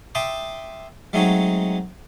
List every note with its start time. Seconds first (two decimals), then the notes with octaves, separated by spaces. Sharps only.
0.15 E5 G5 A5 C6 D6 D#6
1.13 F#3 G#3 A3 C4 D#4 C#5